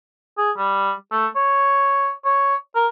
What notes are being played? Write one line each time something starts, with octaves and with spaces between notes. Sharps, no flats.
G#4
G3
A3
C#5
C#5
A#4